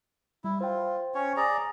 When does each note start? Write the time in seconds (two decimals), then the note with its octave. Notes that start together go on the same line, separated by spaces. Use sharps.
0.44 G3 E4
0.61 F4 C5 G5
1.14 C#4 C#5
1.37 G#4 D5 A#5